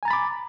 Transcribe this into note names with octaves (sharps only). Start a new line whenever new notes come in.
G#5 A#5 B5 D6 A6